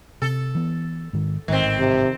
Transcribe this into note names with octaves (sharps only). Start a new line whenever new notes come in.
C3 A4
E3 B3
G#2 D#3
A1 G#2 D#3 C4
C3